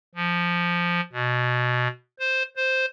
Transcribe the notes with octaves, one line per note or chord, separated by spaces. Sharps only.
F3
B2
C5
C5